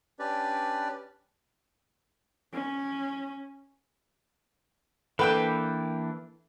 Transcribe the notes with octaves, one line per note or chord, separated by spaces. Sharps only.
C#4 D4 G4 B4 D5
C#4
E3 A#3 D4 A4 B4 G5 E6